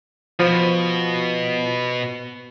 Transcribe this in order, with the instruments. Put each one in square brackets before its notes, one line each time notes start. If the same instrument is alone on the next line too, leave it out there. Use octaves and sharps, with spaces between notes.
[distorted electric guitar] B2 [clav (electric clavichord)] F3